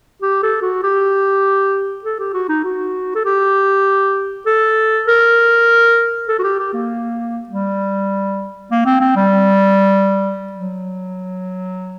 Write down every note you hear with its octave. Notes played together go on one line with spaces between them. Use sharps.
G4
A4
F#4
G4
A4
G4
F#4
D#4
F#4
A4
G4
A4
A#4
A4
F#4
G4
G4
A#3
G3
A#3
C4
C4
G3
F#3